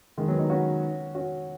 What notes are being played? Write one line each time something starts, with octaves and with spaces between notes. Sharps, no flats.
D#3 G#3
F#3 B3
B3 D#4
C#4 F#4
C#4 F#4